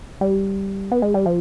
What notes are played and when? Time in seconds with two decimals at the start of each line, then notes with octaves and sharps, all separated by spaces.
0.21 G3
0.92 B3
1.02 G#3
1.14 G3
1.26 F3